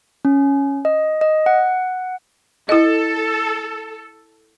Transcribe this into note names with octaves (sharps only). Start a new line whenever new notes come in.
C#4
D#5
D#5
F#5
E4 A4 D#5